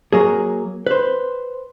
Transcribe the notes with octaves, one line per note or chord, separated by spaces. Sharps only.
F#3 A#3 G#4
B4 C5